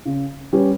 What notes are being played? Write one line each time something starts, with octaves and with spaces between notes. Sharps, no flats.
C#3
G3 C#4 G4 B4